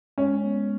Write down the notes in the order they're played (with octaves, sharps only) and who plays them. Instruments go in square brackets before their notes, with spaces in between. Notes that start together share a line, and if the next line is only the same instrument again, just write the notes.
[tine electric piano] G#3 [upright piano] C#4
[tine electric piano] B3